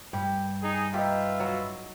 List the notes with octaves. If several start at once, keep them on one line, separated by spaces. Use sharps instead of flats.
G2 G4
D#4 G#4
D#4 F4 G4 B4 E5
F#3